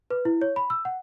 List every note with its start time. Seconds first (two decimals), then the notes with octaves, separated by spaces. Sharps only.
0.10 B4
0.25 E4
0.42 C#5
0.56 B5
0.70 E6
0.85 F#5